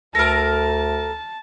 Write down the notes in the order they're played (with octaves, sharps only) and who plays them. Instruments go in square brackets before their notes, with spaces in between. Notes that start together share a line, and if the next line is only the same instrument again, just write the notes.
[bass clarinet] D2 [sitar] A4 A#4 [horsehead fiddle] A5 [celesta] F6 A#6